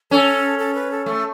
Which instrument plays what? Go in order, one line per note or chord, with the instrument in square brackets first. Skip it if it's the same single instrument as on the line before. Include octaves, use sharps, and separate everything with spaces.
[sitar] C#4 [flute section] A4
[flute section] A4
B4
A4
[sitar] A3 [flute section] A4